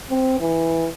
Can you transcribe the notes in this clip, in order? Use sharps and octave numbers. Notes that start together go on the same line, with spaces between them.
C4
E3